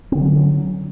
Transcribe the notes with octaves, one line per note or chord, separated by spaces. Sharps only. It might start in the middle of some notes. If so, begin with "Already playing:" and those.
D3 F#3 C4 C#4